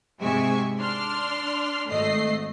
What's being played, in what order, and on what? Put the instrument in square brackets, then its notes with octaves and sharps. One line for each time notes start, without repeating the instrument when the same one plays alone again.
[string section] G#2 C3 G#3 E5 G#5 C#6
D4 C6 F6
G#1 A3 D#5 C7